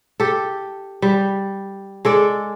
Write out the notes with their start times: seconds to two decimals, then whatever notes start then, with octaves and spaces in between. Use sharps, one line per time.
0.20 G4 A4
1.02 G3
2.05 G#3 A4 D5